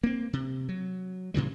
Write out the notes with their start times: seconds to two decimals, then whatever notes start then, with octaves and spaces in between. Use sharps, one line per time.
0.04 A#3 C4
0.33 C3
0.69 F#3
1.34 A2 C#3 E3 G3